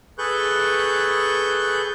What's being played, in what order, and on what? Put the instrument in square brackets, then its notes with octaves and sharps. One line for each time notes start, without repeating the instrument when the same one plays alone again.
[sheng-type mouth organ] G#4 A4 B4 C#6 F#6 G6